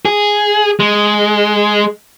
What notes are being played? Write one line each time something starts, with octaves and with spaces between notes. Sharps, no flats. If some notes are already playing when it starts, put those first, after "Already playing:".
G#4
G#3